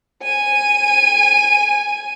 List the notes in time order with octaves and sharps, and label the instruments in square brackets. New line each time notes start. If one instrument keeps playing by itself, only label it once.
[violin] G#5 D#7